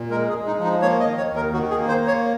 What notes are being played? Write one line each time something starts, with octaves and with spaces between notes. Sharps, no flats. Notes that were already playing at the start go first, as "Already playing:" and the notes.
Already playing: A#2
G#3 A#4
G#4
G#3
D#4
F3
D#4
A#3 C#5
D#5
D#3
C#5
D#2
A#4
D#3 F#4
G#4
A#3
C5
A#3
C#5